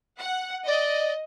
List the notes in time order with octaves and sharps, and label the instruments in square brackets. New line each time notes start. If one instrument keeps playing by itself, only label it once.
[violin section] F#5
[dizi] D5 [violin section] D#5